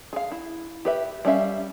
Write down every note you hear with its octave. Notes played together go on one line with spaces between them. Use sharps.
G#4 F5
E4
G4 B4 E5
G3 C#4 E5 F5